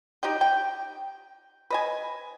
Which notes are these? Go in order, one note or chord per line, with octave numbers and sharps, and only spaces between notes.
D#4 G4 D#5 G5
G5
B4 D#5 G#5